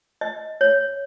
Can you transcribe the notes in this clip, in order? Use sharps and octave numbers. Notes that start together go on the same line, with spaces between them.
D#5
C#5